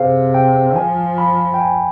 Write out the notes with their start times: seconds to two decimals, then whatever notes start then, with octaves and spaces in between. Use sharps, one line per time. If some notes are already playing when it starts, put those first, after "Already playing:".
Already playing: C3 G#4 C5 F5
0.34 G5
0.76 F3 G#5
1.18 B5
1.54 G5
1.60 G#5